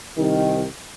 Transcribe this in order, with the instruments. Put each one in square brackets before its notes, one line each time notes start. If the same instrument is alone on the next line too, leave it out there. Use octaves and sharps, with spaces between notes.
[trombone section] C2 D#3